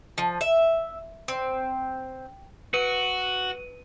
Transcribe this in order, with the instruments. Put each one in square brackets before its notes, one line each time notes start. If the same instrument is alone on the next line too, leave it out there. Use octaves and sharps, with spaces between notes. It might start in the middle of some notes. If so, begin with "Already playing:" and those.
[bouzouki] F3
E5
C4
[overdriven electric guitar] F#4 [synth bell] B4 D#7